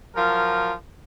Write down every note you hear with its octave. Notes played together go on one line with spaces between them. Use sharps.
F3 F#3 F4 A#4